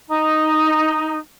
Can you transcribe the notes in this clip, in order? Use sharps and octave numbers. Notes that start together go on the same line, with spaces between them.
D#4